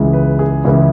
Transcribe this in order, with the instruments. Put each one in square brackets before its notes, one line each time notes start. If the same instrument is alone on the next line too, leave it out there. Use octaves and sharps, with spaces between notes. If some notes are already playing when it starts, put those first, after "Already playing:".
Already playing: [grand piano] C#2 C#3 E3 G#3
B4
G#4
C#2 C#3 E3 G#3 E4